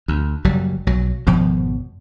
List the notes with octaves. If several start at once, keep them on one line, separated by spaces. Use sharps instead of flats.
D2
F#1 F#3 G3
B1 F#3
G#1 F2 B2 F3